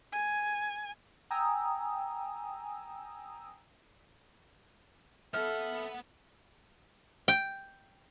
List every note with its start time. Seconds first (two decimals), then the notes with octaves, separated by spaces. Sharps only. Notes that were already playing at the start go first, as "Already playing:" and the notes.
0.12 G#5
1.30 G5 G#5 A#5 D#6 E6
5.34 B3 A4 E5 F#5 F6
7.28 G5